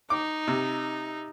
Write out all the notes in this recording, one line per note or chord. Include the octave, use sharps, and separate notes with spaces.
D#4 D6
C3